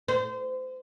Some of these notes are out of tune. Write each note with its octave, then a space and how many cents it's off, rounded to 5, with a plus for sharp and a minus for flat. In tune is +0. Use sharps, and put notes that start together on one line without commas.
C5 -30